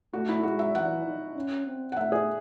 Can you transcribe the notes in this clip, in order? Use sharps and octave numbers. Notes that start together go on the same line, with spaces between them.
A3 F#4
E4
G#3 F#4
E5
E3 F#5
D#4
C#4
C4
F#5
A3 E5
G#4